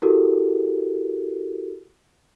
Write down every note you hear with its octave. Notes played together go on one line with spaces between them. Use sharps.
E4 F#4 G4 A4 A#4